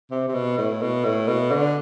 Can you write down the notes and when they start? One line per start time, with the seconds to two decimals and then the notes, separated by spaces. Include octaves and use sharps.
0.11 C3
0.28 C3
0.34 B2
0.58 A2
0.82 B2
1.04 A2
1.28 B2
1.51 D3